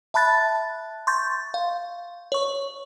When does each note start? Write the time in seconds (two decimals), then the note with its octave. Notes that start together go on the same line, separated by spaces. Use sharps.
0.14 E5 A5 B5 F#6 A6
1.07 C6 C#6 G6 A6
1.54 F5
2.32 C#5 C#6